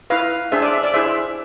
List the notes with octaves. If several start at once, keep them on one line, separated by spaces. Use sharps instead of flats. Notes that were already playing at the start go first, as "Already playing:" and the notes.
E4 B4 F5
D4 G#4 C5 E5
D5
E5
D5
E4 G#4 C5 E5